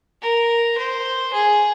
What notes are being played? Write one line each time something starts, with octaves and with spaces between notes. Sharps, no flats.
A#4
C5
G#4